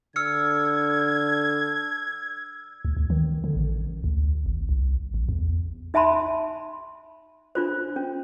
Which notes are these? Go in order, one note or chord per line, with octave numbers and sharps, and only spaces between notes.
D3 E6 F6 G#6 C#7
D2
D2
D#3
D3
A1
D2
G#1
C2
A1
E2
D#4 E5 G#5 A5 B5 C6
D4 F4 C5
C#4